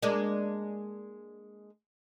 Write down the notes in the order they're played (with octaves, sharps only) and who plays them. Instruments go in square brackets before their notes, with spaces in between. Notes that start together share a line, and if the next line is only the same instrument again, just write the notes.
[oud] G#3 A#3 D4